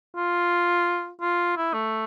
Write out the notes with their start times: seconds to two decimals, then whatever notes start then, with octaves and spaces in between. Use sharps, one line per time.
0.16 F4
1.21 F4
1.57 E4
1.74 A3